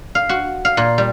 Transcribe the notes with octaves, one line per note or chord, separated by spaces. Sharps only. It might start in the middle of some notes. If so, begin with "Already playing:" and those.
F5
F#4
F5
A#2
G3